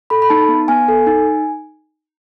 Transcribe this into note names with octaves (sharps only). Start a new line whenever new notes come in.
A4 B5
B5
D#4 A5
B3
B3 G#5
A4
D#4